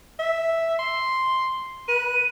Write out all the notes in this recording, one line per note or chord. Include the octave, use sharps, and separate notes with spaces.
E5
C6
B4 D#7